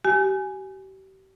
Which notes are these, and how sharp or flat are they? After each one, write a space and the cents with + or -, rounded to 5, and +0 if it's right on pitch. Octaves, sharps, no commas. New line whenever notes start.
G4 -40 G#5 +0